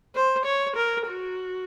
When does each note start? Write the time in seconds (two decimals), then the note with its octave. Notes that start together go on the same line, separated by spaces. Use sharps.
0.15 C5
0.46 C#5
0.76 A#4
1.07 F#4